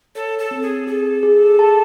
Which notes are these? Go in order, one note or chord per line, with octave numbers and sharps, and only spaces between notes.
A4 C#5
A4
C4
G#4
G#4 A4
G#4
A5